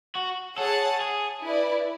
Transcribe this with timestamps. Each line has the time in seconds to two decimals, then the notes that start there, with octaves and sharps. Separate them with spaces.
0.16 F#4
0.58 G#4 A4 C#5 F#5 A5
1.01 G#4
1.43 E4 B4 D5